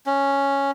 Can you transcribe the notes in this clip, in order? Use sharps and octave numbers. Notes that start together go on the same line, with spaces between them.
C#4